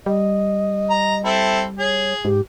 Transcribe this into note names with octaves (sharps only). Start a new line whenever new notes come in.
G3 D#5
A#5
C4 E4 A4
G#4 C#5
G#2 G4